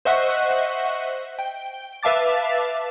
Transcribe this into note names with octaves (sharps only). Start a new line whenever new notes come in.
C5 D#5 E5 F#5 C#6 F#6
G5
B4 E5 F5 A5 D6 A6